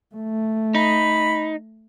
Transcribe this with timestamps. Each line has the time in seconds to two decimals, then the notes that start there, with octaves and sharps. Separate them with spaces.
0.15 A3
0.75 D#4 B5